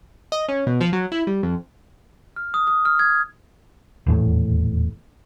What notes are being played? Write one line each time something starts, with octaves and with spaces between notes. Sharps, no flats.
D#5
C#4
B2
F3
F#3
E4
G3
F2
F6
D#6
D#6
F6
G#6
D#1 E2 A2